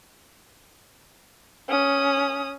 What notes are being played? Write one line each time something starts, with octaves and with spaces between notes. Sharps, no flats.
C#4 D#6